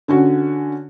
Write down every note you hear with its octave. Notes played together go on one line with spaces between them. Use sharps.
D3 C#4 F#4